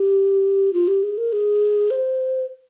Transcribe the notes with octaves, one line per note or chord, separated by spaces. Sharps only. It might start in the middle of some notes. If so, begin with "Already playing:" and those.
Already playing: G4
F4
G4
G#4
A#4
G#4
C5